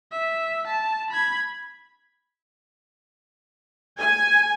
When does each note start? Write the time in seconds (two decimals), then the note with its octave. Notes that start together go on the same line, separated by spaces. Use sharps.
0.12 E5
0.67 A5
1.10 B5 G#6
3.99 G#5